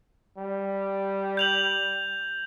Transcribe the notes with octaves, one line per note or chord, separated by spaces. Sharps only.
G3
G6 F7 F#7